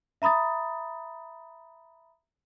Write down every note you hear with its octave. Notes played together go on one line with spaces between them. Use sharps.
E5 A#5 B5 D#6 A6